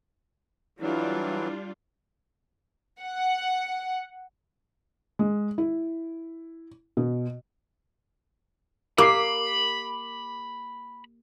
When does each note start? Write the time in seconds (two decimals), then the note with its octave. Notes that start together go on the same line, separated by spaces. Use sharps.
0.80 E3 F#3 G3 D4 E4 F4
3.01 F#5
5.19 G#3
5.58 E4
6.97 B2
8.98 A#3 G4 A#4 B5 D6 C7